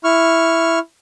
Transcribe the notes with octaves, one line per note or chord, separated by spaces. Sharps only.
E4 C#6 F6